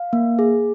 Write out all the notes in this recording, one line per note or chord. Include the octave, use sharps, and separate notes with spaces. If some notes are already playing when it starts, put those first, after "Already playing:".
Already playing: F5
A#3
G#4